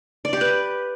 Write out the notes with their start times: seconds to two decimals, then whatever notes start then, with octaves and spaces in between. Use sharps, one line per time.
0.25 D5
0.33 G4
0.41 B4